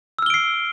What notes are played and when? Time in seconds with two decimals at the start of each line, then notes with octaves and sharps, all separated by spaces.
0.19 E6
0.22 F6
0.26 G7
0.30 D7
0.34 C7